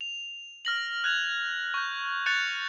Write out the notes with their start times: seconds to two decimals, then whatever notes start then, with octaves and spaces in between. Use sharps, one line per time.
0.01 F7
0.65 F6 A#6 F#7
1.04 F#6 G#6 F7
1.74 C#6 G6
2.26 C#6 F#6 G6 A6 C#7 F7